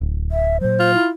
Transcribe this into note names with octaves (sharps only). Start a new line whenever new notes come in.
D1
E5
A#2 F#3 C5
F4
E4